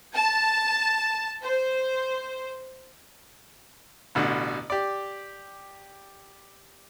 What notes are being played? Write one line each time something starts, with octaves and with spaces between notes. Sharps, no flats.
A5
C5
A1 B2 D3
G4 D5